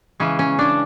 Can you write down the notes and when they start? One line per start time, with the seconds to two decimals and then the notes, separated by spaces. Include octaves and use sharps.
0.20 C#3 E3 G#3 C#4
0.39 C#4
0.59 D4